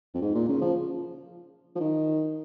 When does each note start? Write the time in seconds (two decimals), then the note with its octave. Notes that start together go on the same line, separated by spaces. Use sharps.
0.14 F2
0.22 G#2
0.35 A#2
0.48 C#3
0.61 F3
1.75 F3
1.80 D#3